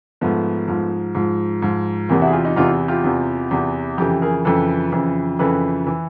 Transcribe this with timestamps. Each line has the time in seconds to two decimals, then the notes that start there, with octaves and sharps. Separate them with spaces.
0.21 G#2 F3 A3 B3
0.68 G#2 F3
1.15 G#2 F3
1.62 G#2 F3
2.09 E2 C3 E3 A#3 C4
2.22 E4 F#4
2.27 G#4
2.33 F4 G4
2.44 D#4 F4
2.56 E2 C3 E3 D#4 F4
2.88 F4 G4
3.04 E2 C3 E3
3.51 E2 C3 E3
3.98 F2 C#3 E3 G4 A4
4.22 G#4 A#4
4.45 F2 C#3 E3 A4 B4
4.92 F2 C#3 E3
5.39 F2 C#3 E3 A4 B4
5.87 E3